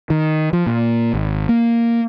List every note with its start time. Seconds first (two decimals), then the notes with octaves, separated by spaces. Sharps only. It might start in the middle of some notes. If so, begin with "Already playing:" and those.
0.10 D#3
0.53 F3
0.67 A#2
1.14 G#1
1.49 A#3